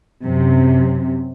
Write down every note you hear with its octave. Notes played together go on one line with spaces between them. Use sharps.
F#2 C3